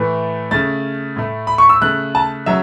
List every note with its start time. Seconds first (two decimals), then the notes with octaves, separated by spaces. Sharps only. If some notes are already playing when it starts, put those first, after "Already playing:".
Already playing: A2 E3 A3
0.51 C#3 A3 A6
1.16 A2 A3
1.47 B5
1.58 C#6
1.69 E6
1.81 C#3 A3 F#6
2.15 A5
2.46 C#3 F#3 E5